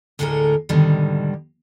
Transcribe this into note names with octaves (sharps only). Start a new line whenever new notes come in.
D2 A2 D3 G#3 A4 A#4
G#2 B2 D3 D#3 G3